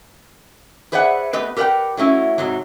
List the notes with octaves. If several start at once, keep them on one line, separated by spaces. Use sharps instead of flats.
G#4 B4 C5 D5 E5 F#5
A3 B3 G4 B4 D#5
G4 A#4 B4 D5 F#5 G5
F#3 A3 C#4 E4
G#2 C3 F#3